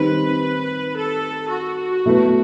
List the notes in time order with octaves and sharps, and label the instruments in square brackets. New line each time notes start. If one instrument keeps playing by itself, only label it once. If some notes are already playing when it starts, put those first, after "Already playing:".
Already playing: [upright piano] D#3 G3 C4 D#4 [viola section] B4
[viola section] A4
F#4
[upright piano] B2 F#3 A3 E4 B4